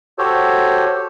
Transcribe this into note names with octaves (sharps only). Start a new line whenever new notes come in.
F#4 G4 A4 C5 C#5